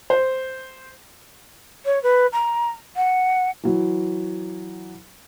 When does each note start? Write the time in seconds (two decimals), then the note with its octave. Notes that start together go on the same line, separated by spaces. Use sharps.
0.10 C5
1.85 C#5
2.03 B4
2.33 A#5
2.96 F#5
3.63 E3 F#3